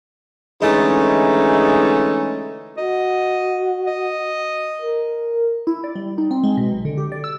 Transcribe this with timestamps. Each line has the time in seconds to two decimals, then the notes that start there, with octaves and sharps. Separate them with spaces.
0.62 D3 E3 G#3 A3 C#4 D#4
2.78 F#4 D#5
3.87 D#5
4.82 A#4
5.67 E4
5.84 D5
5.95 G3
6.18 D#4
6.31 C4
6.44 G#3
6.57 B2
6.71 B1
6.85 D3
6.97 G4
7.12 D5
7.24 E6